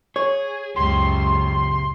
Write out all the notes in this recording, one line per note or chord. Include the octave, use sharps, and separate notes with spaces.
G#4 C#5
C#2 F#2 C#3 G4 C6